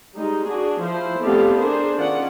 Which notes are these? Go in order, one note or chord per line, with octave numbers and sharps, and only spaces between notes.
G3 G#3 D#4
D4 F#4 G#4
F3 E4 C5
A3 B3 C4 G4 D5 F5
D4 G#4 A#4 C5
D#3 C#4 F4 D5 F#5